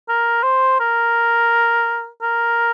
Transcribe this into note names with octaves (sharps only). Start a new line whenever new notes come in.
A#4
C5
A#4
A#4